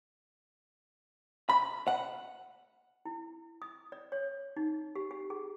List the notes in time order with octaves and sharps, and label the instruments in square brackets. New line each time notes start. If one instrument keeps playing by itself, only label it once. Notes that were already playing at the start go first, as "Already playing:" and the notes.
[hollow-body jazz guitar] B5
F#5
[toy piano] E4
D#6
D5
C#5
D#4
G4
G4
G#4